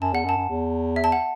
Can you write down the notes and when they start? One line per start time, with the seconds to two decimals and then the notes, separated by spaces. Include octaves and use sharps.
0.02 F#2 A5
0.13 E2 F#5
0.25 F#2
0.29 A5
0.37 F#2
0.49 E2
0.96 E5
1.04 A5
1.12 F#5